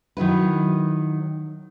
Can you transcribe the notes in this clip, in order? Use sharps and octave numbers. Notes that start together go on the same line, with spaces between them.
D#3 F#3 E4 B4